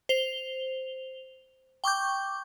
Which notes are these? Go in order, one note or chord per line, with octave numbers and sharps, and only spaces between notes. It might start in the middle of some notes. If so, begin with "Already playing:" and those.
C5 F7 G7
G5 C#6 D6 G6